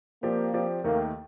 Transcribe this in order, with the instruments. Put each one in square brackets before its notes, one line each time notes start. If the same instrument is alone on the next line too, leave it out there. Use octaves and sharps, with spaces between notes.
[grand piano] F3 C4 G4 D5 [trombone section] A#3
[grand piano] F3 C4 G4 D5
[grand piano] D#2 D#3 A3 [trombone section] A#3